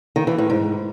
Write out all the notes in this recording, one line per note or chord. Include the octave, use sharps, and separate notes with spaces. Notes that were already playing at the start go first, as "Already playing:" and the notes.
D#3
E3
A2
G#2